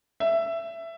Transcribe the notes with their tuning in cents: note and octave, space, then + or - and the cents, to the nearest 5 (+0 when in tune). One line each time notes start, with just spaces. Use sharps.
E5 +15